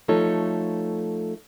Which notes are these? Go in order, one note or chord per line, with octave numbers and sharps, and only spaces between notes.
F3 A3 D#4 A4 C#5